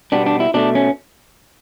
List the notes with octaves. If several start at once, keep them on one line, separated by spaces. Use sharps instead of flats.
B2 G3 B3 D4
D4
E4
B2 A3 D4
C#4